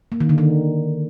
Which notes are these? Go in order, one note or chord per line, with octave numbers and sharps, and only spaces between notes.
A#3
D#3
D3
D#3